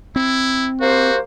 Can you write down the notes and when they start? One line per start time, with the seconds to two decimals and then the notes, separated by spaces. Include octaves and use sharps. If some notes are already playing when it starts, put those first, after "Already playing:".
0.16 C4 E4
0.81 A#3 F#4 G4 C5